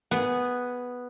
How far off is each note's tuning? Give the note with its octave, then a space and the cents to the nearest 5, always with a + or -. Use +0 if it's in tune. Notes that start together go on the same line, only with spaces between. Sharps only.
B3 +0 G#4 +0